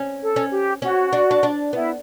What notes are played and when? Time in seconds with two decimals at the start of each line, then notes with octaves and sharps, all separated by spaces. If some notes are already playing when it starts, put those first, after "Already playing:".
Already playing: C#4
0.21 A4
0.36 C#4
0.52 G4
0.82 C#4 F#4
1.13 D4
1.31 D4
1.43 D4
1.73 B3 E4